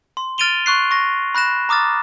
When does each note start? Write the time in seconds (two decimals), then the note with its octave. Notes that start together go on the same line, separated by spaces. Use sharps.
0.17 C6
0.38 F6 A6 D7 D#7 F7 G7
0.66 C6 C#6 F#6 C7
0.91 C#6 A#6
1.35 B5 F#6 A#6 E7
1.69 A#5 D6 D#6 F6 A6